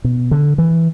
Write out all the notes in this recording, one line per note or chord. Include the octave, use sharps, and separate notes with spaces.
B2
D3
E3